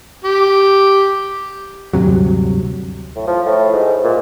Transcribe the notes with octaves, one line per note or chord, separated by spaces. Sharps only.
G4
D2 G2 C3 F#3
A2
F3
A2
G#2
A#2